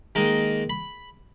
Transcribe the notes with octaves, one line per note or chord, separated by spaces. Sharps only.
D#3 G#3 A#3 D#4 D#5
B5